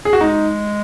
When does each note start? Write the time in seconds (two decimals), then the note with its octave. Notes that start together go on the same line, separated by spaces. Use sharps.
0.05 G#4
0.13 F#4
0.21 G#3 D#4